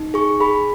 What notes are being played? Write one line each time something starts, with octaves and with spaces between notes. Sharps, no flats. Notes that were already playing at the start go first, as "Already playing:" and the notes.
Already playing: D#4
G#4 C#6
G#4 B5